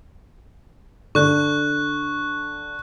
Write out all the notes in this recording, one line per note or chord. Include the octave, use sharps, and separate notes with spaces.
D3 C#6 F#6